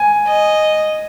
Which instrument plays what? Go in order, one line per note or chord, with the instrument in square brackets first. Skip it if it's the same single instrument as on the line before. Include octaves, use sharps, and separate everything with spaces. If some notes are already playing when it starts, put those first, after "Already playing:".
Already playing: [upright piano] G#5
[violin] D#5